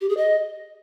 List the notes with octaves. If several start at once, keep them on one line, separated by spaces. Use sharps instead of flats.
G4
G#4
D#5